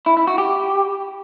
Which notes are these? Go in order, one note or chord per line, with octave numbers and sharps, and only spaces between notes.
E4
E4
F#4
G4